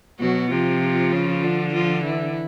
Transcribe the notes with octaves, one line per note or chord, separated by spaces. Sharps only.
B2 F#3 F#4
C3 F3 F4
C#3
D3
F3 F4
E3 E4